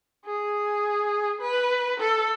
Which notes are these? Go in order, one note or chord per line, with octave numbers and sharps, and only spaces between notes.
G#4
B4
A4